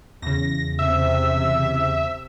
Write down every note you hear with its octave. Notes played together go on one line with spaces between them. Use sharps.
E2 C#3 A#6
C3 E5